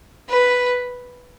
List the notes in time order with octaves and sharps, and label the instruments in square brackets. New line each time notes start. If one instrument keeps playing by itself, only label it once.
[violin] B4